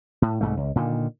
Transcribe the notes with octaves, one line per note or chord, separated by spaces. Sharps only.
A2
C2 G#2 A3
C#2
A#2 D3 D#3